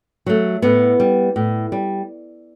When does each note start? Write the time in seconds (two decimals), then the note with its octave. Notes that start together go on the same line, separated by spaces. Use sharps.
0.26 F#3 A3
0.62 A2 B3
1.00 G3
1.36 A2
1.72 G3